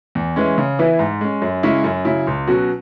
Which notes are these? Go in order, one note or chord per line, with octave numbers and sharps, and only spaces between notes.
E2
E3 G#3 C#4
C#3
E3 B3 E4
G#2
G#3 C#4
F#2
C#3 G#3 C#4 E4
F#2
C#3 F#3 E4
C#2
B2 F#3 C#4 F#4